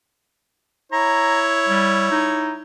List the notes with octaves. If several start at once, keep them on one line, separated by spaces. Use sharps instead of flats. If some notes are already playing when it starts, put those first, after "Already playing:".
E4 C#5 A#5
G3
D#4